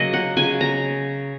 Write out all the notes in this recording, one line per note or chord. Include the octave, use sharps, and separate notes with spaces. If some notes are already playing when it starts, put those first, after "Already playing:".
Already playing: C#3 F#3 A#3 D#5
F#5
C#3 G#5
A#5